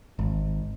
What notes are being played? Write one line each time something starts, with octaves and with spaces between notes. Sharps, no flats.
G#1